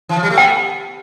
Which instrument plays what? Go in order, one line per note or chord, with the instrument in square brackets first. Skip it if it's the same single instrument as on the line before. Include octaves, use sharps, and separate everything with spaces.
[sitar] E3
F3
G3
A3
[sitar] B3 [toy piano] G5